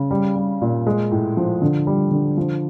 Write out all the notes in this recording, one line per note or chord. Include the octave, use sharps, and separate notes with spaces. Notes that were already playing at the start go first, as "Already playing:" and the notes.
Already playing: C#3
G3
G3
A#2
G#3
A2
F3
D3
G3
D3
F3